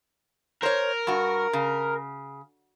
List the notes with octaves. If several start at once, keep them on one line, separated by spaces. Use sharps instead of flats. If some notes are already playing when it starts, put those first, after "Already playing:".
A#4 C5 C#5
G2 F#4
C#3